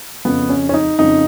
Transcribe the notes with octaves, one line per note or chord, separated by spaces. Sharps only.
F2 C#3 F3 B3
C#4
C#4
D#4
F2 C#3 F3 D#4